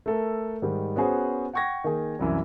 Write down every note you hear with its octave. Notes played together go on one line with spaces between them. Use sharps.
A3 A4 A#4
G#2 D#3 G3
B3 C#4 F#4 G#4 C5
F#5 G5 C#6 G#6 A#6
D#3 A#3 G#4
C2 F#2 E3